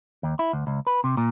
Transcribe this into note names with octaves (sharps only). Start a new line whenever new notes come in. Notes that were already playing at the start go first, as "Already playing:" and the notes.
D#2
E4
D2
C#2
B4
C3
A#2